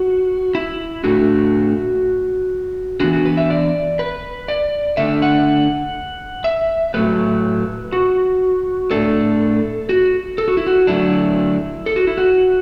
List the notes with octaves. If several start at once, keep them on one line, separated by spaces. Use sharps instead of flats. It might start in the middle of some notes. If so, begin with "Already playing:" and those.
Already playing: F#4
E4
A2 A3 D4 F#4
E3 B3 D4 F#4
F#4
B4
E5
D5
B4
D5
D3 A3 D4 E5
F#5
E5
A2 F#3 A3 B4
F#4
A2 A3 D4 A4
F#4
A4
F#4
E4
F#4
D3 F#3 A3 D4 E4
A4
F#4
E4
F#4